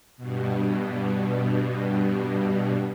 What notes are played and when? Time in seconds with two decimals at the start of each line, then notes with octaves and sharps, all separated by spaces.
0.17 G2 B2